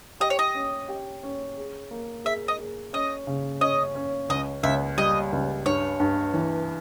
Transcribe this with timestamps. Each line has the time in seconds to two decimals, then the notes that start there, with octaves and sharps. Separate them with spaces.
0.20 G4 D#5
0.30 C#5
0.39 D#5
0.55 C#4
0.88 G4
1.23 C#4
1.57 G#4
1.91 A#3
2.25 G#4 E5
2.48 D#5
2.59 G#4
2.93 C#4 D#5
3.27 C#3
3.61 C#4 D#5
3.95 C#4
4.29 C#2 D#5
4.63 C#2 E5
4.98 G3 D#5
5.32 C#2
5.66 G2 C#5
6.00 G2
6.34 E3